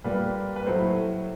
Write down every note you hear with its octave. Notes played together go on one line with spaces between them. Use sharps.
A#2 G3 A#3 B4
B4
A2 F#3 A3 C5